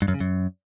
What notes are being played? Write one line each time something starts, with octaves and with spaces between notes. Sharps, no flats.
G2
F#2
C#3
F#2